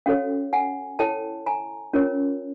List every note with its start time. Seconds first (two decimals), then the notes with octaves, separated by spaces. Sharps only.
0.06 C#4 F#4 A4 C#5 F5 G5
0.53 F#5 G#5
0.99 E4 A4 C#5 G5 A5
1.46 G#5 A#5
1.93 C#4 F4 A#4 C#5